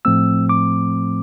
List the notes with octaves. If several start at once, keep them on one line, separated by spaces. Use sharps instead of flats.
A2 F3 A3 C4 E6
D6